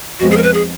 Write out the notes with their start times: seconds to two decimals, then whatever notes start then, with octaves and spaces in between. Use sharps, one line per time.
0.20 F2 F3 G#3 B3 F#4
0.31 G#4
0.37 A#4
0.43 B4
0.54 G#4